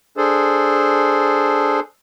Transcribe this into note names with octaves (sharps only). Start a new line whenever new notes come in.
D4 G#4 A4 C5